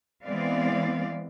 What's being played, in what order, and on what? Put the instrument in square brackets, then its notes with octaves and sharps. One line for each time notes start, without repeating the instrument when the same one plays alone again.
[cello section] E3 G#3 B3 C4 D5 F5